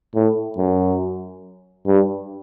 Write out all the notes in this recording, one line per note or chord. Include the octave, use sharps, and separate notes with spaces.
A2
F#2
G2